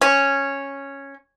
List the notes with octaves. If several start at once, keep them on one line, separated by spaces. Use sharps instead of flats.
C#4